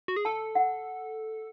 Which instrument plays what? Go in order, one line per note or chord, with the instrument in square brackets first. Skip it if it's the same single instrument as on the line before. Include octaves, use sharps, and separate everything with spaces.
[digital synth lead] F#4
G#4
[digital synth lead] A4 [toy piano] A5
[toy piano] F#5